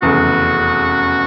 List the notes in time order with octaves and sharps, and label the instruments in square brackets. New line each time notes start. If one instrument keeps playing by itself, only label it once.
[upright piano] F1 E2 C#3 [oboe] F#4